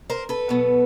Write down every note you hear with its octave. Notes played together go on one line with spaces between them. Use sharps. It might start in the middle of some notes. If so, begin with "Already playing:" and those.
A#4 C5
A4 B4
B2 F#3 B3